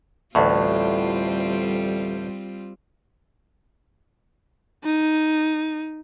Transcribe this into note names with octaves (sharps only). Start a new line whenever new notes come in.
A1 D2 A2 G3 C4 F4
D#4